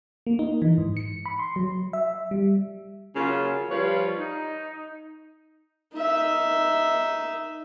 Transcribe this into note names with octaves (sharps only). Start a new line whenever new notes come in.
A#3
D#4
E3
G#2
C#7
B5
C6
F#3
E5
G3
C#3 F#3 A#3 F4
F3 G3 F4 B4 C#5
D#4
D#4 E5